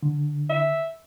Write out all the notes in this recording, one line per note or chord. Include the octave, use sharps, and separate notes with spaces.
D3
E5